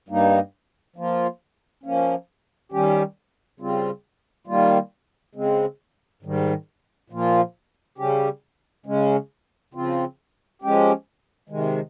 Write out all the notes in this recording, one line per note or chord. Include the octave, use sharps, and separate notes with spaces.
G2 G3 A#3 D#4
F3 A#3 F4
F3 A#3 C#4
D#3 G3 C#4 G4
C#3 G3 C4 F4
D#3 G3 A#3 F4
C#3 G#3 C4
G#2 D#3 G3
A#2 F3 A#3 F4
C#3 G3 C#4 G4
C#3 G#3 C#4
C#3 F3 C4 F4
F3 G#3 C#4 G4
C3 D#3 G#3